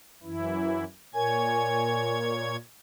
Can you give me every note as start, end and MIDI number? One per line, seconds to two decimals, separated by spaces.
0.23 0.84 42
0.23 0.84 52
0.23 0.84 64
1.14 2.57 46
1.14 2.34 70
1.14 2.57 73
1.14 2.17 80
1.14 2.57 92